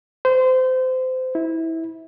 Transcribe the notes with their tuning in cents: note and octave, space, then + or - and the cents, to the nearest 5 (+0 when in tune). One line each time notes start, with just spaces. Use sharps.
C5 -25
E4 -20